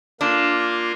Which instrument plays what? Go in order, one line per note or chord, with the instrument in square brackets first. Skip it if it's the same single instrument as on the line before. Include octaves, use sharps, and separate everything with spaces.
[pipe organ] A#3 F4 [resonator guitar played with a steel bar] D4